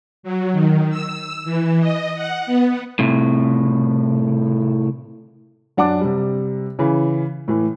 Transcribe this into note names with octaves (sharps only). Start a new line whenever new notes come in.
F#3
D#3
E6
E3
D#5
F#5
B3
A2 C3
F#2 D4 F#5 A5 D6
C3 G3
C#3 E3
A2 E3